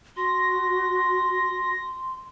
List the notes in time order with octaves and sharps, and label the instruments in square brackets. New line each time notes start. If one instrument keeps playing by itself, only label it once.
[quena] F#4 [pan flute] C6 [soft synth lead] A#6